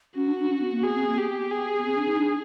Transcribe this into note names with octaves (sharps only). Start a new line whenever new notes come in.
C#4 F#4
D4
D4
C#4
B3
A#3
B3 G#4
C4
A#3
B3 G4
G#4
C4
D4
D#4
D4